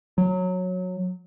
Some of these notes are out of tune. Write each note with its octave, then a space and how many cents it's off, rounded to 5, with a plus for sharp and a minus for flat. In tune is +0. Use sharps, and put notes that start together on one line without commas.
F#3 -15